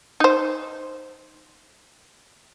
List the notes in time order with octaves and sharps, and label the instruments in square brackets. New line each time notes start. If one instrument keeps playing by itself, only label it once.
[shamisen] D#4 C5